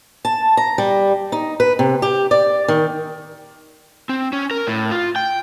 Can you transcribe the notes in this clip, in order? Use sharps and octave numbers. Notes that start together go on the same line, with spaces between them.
A5
A#5
G3
D#4
B4
C3
G4
D5
D#3
C4
C#4
A#4
A2
F4
G5